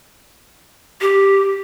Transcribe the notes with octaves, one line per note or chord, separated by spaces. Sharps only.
G4